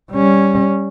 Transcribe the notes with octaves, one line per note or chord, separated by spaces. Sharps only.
G3 C#4